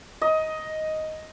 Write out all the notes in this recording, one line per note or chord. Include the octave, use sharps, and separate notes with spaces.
D#5